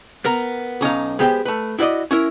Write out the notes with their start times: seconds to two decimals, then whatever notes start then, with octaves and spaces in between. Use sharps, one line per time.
0.25 B3 A#4 A#5
0.81 B1 C#4 D#4 F5
1.19 G#3 B3 G4 C5 D5 G5
1.45 A3 B4
1.79 E4 F#4 C5 D5 D#5
2.11 C#4 E4 A#4